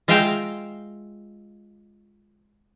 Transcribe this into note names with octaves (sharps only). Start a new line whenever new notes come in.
G#3 F4 E5 F5 G5 A#5